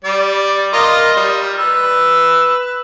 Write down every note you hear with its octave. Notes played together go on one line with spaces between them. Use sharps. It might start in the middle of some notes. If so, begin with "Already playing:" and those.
G3 D5
F4 A#4 D#5
G3
B4 E6